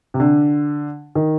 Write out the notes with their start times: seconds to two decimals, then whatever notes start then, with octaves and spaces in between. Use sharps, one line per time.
0.14 C3
0.20 D3
1.15 D#3